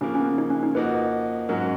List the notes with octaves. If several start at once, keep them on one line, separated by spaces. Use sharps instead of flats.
C#3 F3 A#3 C#4
C#4
B3
D#4
C#4
D#4
F2 F3 A#3 D#4 F#4 B4
G#2 F#3 C#4 A#4